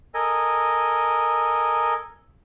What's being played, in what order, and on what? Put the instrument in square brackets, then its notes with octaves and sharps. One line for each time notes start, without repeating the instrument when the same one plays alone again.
[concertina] A4 A#4 D#5 G#5